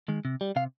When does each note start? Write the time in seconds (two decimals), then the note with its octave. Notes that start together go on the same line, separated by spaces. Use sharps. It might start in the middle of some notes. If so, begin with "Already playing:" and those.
0.08 D#3 G#3
0.25 C3
0.41 G3
0.56 C3 F5